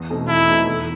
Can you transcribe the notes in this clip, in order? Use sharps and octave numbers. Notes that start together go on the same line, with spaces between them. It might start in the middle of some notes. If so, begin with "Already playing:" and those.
Already playing: E2
B2 A3 C4 D#4
E2 E4
B2 A3 C4 D#4
E2